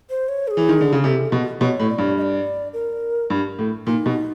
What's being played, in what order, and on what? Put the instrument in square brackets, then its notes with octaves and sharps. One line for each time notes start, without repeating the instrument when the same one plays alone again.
[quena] C5
C#5
A4
G#4
[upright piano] E3
D#3
D3
C#3
[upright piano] C3 [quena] A4
[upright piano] B2
[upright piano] B2 [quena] C#5
[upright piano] A2
[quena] D5
[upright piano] G2
[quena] D#5
D5
A#4
[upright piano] G2
A2
[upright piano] A#2 [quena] D#4
[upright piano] B2